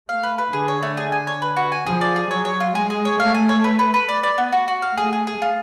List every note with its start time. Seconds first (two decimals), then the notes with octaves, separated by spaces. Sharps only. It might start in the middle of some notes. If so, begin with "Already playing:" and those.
0.09 A3 F5
0.23 B4
0.38 B4
0.53 D3 G#4
0.68 C#5
0.83 A3
0.97 G#4
1.12 G#5
1.27 C#5
1.42 B4
1.56 F#4
1.72 G#5
1.86 F3 G#4
2.01 D5
2.16 G#4
2.30 F#3 C#5
2.45 C#5
2.60 F4
2.75 G#3 G#4
2.90 G#4
3.05 C#5
3.20 A3 F5
3.34 G#5
3.49 C#5
3.64 B4
3.79 B4
3.94 B4
4.09 D5
4.23 D5
4.38 B3
4.52 F#4
4.68 F#4
4.82 F5
4.97 A3 G#4
5.13 G#4
5.27 G#4
5.42 F4